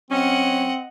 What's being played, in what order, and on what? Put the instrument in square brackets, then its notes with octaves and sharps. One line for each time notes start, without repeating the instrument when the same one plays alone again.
[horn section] F#3 C#4 [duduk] C4 [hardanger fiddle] D#5 F#5